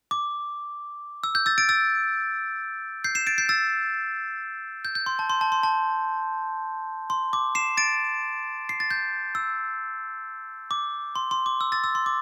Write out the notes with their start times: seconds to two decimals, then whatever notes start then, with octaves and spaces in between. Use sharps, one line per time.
0.11 D6
1.24 E6
1.35 G6
1.46 E6 A6
1.58 A6 D7
1.69 E6 A6
3.04 G6 C7
3.15 C7 E7
3.27 A6 D7
3.38 G6 C7
3.49 E6 A6
4.85 G6
4.95 G6
5.06 C6
5.19 A5
5.30 C6
5.41 A5
5.52 C6
5.63 A5
7.10 C6
7.33 D6
7.55 C7 E7
7.77 A6 D7
8.69 C7
8.80 A6
8.91 G6
9.35 E6
10.71 D6
11.16 C6
11.31 C6
11.46 D6
11.61 E6
11.72 E6 A6
11.84 E6
11.95 C6
12.06 D6